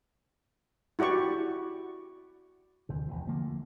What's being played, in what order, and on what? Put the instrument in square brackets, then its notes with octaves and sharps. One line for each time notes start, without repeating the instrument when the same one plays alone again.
[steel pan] E4 F#4 G4 D5 C#6
[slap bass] D2 C3
G#1 E2 F3
D3 F3 A3 A#3